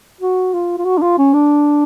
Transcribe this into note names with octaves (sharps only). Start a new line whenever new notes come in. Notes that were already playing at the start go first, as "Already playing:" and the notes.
F#4
F4
F4
F#4
D4
F4
C#4
D4